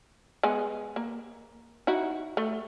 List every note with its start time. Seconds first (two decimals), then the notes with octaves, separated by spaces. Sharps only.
0.43 G#3 B3 G#5
0.96 A#3
1.87 D#4 E4 F#4
2.37 A3